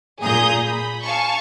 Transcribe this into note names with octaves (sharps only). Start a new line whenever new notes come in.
A#2 G#4 A#5 D#6 G6
B5
F5 G#5 A5 C#6